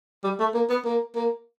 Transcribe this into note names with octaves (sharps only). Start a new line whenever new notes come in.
G3
A3
A#3
B3
A#3
A#3